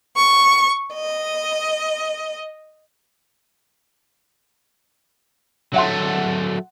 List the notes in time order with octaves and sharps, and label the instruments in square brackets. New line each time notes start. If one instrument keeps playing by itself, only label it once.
[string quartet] C#6
D#5
[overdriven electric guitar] F#3 A3 [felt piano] E5 F#5 C6